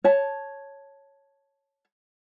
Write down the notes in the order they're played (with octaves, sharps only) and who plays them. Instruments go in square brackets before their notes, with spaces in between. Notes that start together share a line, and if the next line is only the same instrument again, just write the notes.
[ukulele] C#5 A5